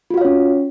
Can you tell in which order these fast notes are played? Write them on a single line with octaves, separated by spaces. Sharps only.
F4 F#4 F5 C#5 C#4